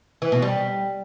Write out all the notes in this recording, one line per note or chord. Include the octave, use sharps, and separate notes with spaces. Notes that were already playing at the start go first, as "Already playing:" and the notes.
E3
B2
G3